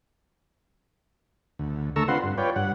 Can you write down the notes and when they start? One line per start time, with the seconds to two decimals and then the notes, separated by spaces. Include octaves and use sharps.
1.59 D2
1.96 D3 A3 A4 A#5 C#6 E6
2.08 C4 D4 F4 B4 F#5 C6
2.24 G2
2.38 F4 B4 C#5 D5 G5
2.56 G2 F#5